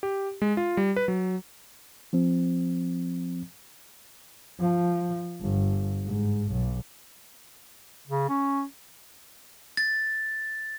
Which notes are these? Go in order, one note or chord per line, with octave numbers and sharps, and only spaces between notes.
G4
G#3
F4
G3
B4
F#3
F3 C4
F3
G1
G#2
B1
C#3
C#4
A6